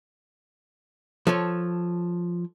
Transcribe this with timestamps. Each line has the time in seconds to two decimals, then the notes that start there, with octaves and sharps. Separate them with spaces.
1.27 F3 A4 C#5